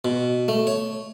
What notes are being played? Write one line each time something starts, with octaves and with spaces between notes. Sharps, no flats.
B2
A3
C#5